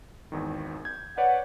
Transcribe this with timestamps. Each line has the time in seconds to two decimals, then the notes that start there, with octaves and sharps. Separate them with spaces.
0.32 G#1 E2 D#3
0.85 G6 G#6
1.18 B4 C#5 D5 F#5